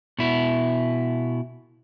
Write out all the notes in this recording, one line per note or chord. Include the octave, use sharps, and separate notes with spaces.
B2 E4